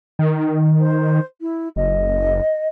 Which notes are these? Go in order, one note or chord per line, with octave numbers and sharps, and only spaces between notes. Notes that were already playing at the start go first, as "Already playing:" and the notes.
D#3
C5
E4
F#1 D#5